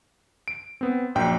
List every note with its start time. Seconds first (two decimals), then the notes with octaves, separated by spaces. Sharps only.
0.48 D7
0.81 B3 C4
1.15 A#1 F#2 G5